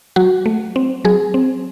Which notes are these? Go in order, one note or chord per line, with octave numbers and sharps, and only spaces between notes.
F#3 F#4
A3
C4
F#3 G#4
C4